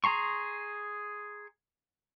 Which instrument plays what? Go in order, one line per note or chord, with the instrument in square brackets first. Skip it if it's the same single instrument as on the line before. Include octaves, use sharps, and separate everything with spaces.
[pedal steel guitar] G#4 A#5 C6 C#6